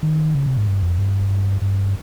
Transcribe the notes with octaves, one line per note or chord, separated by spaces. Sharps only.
D#3
C#3
C3
G#2
G2
F2
G2
G2